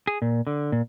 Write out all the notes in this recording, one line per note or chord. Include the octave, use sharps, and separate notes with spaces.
G#4
A#2
D3
A#2